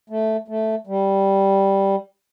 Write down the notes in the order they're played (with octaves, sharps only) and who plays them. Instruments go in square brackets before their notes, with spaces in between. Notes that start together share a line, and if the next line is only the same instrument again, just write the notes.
[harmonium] A3
A3
G3